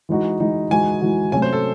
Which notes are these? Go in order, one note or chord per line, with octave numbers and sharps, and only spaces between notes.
E3 G#3 D#4 F#4
E3 G#3 D#4 F#4
E3 G#3 D#4 F#4 G#5
E3 G#3 D#4 F#4
C3 F#3 A3 C#4 G#5
C5
A4